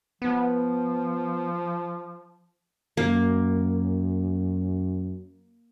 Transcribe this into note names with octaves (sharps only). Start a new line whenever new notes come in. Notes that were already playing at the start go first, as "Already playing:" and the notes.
F3 B3
F#2 A#3